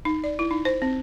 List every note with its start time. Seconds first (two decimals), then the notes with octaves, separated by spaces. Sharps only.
0.05 D#4
0.24 D5
0.39 E4
0.51 D#4
0.65 C5
0.82 C4